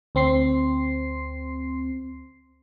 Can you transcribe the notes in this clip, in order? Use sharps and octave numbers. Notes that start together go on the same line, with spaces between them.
D2 C4 C6 C7